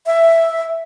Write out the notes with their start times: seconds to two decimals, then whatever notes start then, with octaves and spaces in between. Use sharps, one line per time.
0.06 E5